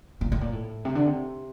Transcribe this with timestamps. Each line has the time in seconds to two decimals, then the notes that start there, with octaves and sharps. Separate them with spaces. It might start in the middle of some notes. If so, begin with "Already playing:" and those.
0.21 A#2
0.32 A2
0.41 A#2
0.53 A2
0.85 C3
0.95 D3
1.06 C3